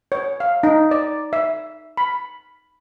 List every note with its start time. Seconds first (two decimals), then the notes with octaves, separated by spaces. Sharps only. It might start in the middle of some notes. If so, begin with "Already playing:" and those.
0.12 C#5
0.40 F5
0.63 D#4
0.91 D5
1.33 E5
1.97 B5